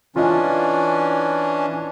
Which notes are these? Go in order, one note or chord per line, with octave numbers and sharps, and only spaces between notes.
E3 C#4 D4 F4 D#5